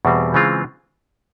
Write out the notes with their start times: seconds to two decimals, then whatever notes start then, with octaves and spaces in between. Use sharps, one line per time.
0.05 E2 B2 G3 C4
0.34 C#3 E3 G#3 C4 F4